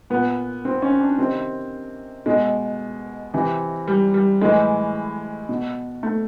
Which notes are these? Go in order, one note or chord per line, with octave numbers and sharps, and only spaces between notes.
A#2 B3
C4
C#4
D4
C3 D#3 C4
B2 G#3
C3 E3
G3
G3
A2 E3 G#3
B2
A3